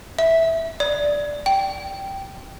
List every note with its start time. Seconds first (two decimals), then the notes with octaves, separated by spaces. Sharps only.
0.19 E5
0.80 D5
1.46 G5